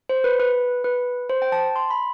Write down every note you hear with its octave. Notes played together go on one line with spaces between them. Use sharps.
C5
B4
B4
B4
C5
G5
A5
C6
B5